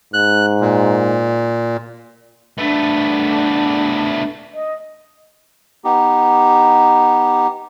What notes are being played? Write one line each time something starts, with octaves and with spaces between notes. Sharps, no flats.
G#2 F#6
A#2
A3 B3 D4
D#5
B3 D#4 G4